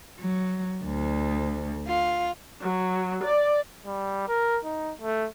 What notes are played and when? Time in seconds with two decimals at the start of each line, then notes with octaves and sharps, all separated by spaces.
0.18 F#3
0.84 D2
1.87 F4
2.62 F#3
3.24 D5
3.86 G3
4.28 A#4
4.65 D#4
5.02 A3